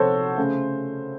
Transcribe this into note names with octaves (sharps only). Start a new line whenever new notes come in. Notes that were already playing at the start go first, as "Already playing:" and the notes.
Already playing: C3 F3 F#4 A4 C5 C#5
C#3 A3